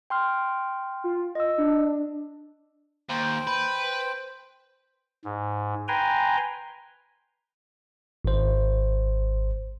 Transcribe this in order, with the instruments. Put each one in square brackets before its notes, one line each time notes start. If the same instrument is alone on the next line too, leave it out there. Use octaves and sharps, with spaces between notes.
[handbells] G5 C6 F6
[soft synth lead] F4
[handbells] D#5 E6
[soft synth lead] D4
[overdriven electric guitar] D#2 [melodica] C5 G5
[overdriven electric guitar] B4
[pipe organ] G#2
B4 G5 G#5 A#5 C6
[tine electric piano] G#1 C5